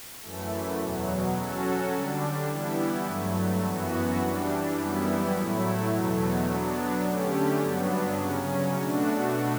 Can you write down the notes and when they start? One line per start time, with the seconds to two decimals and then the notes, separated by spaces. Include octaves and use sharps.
0.21 F#2 E3 A3
0.78 E2 B2 F#3
1.34 F#3 C#4 F#4 A4
1.91 D3 G3 D4
2.48 E3 G3 B3 E4
3.05 G2 F#3 A3
3.62 F#2 E3 B3 F#4
4.19 E3 G3 D4
4.76 F#2 E3 G3 B3 E4
5.33 A2 F#3 A3 E4
5.89 E2 B2 F#3 A3
6.46 F#3 B3 D4
7.03 D3 A3 C#4 G4
7.60 G2 F#3 B3 D4
8.17 C#3 F#3 C#4
8.74 B2 A3 D4 F#4